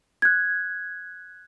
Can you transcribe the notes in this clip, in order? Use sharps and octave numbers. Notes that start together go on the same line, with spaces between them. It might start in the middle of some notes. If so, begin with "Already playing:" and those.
F#6 G#6